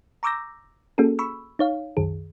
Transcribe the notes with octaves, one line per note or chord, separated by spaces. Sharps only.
A#5 C#6 D6 E6 G6 A#6
A#3 C#4 F#4 G#4 A4
B5 C#6 E6
D#4 C#5 F5
C2 F#2 D#3 G#4